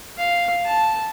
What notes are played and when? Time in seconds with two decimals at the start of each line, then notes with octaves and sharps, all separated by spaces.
0.18 F5
0.65 A5